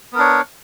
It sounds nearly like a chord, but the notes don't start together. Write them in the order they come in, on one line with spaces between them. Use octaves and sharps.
B3 A#4 D4 C#5